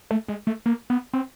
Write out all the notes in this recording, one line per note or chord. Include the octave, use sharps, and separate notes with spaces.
A3
G#3
A3
A#3
B3
C4